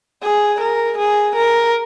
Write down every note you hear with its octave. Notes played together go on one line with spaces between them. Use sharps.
G#4
A#4
G#4
A#4